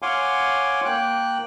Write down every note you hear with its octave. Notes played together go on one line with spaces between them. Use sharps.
C#5 F5 F#5 G#5 C6 D6
A#3 G5 F#6